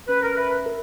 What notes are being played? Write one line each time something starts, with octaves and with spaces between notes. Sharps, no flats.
C#4 B4
A#4
B4 E5
A#4